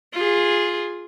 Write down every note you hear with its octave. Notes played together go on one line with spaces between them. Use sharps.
F4 G#4